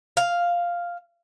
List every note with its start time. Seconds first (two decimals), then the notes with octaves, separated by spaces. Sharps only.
0.17 F5